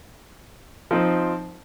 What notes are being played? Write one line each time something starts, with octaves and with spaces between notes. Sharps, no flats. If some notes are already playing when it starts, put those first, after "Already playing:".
F3 C4 D#4